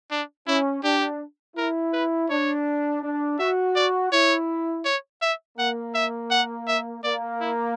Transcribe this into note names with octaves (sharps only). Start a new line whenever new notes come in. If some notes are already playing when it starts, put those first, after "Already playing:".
D4
C#4 E4
D4 G4
E4 A#4
B4
D4 C#5
D4
F#4 E5
D5
E4 C#5
C#5
E5
A#3 F#5
E5
F#5
E5
A#3 D5
E4